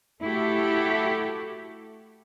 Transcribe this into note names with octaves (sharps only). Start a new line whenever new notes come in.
A3 E4 F#4 G4 A4